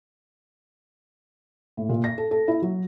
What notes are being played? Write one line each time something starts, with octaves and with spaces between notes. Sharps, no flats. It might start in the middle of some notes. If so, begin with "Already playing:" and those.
A2
A#2
A#6
A4
A4
E4
F#3